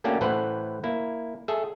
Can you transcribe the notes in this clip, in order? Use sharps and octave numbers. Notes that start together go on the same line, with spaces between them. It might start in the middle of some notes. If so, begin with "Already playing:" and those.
A3 A#3 C#4 D4 F#4 G4
A2 E3 B4 C5 F#5
A#3 E4
G#4 A4 E5